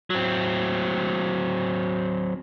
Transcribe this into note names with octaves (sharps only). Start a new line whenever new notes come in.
F#3 C4